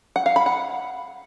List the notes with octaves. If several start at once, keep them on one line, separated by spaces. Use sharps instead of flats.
F#5
F5
B5
F#5